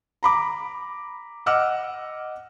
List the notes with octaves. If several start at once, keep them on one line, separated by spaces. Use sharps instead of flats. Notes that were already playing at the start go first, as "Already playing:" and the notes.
A#5 B5 D6
D#5 F#5 D6 E6 F6